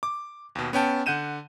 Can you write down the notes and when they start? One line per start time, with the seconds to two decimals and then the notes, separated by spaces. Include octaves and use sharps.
0.03 D6
0.55 D#2 B2
0.73 B3 C#4 G5 A5
1.06 D3 F#5 G6 D#7 E7